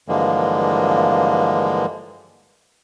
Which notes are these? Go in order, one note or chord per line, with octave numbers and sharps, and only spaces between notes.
G2 D3 E3 F3 G#3 A#3